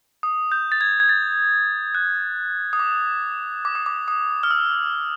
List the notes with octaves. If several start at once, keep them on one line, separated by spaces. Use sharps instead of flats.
D#6
G6
A6
G#6
G#6
A6
F#6
D#6
D6
D6
D#6
D6
D#6
F6
E6